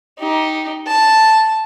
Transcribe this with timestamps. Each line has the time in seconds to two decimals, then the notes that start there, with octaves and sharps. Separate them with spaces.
0.19 D#4 G4
0.87 A5